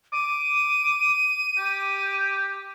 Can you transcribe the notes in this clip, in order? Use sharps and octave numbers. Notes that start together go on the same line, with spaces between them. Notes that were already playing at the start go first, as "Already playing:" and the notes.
D6 D#7
G4